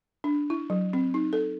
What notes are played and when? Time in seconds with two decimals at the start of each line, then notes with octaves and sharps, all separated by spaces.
0.24 D4
0.50 E4
0.70 F#3
0.93 C4
1.14 D#4
1.33 A4